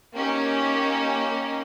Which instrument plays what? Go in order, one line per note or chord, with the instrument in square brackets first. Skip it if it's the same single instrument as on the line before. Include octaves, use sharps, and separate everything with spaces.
[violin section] A#3 C#4 D#4 G4